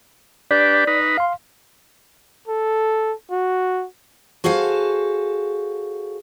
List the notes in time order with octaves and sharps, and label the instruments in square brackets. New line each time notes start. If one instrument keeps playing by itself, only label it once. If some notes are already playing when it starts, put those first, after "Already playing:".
[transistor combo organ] D4 G4 B4 [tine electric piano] D5
[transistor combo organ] D#4 B4
[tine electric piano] F5 C6
[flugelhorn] A4
F#4
[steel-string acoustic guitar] F#4 G#4 A4 C5 F5